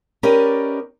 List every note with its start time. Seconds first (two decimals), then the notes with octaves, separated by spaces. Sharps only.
0.23 C#4 G4 A#4 B4 D5 D#5